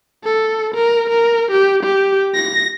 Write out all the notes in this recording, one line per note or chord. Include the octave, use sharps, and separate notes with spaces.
A4
A#4
A#4
G4
G4
A#6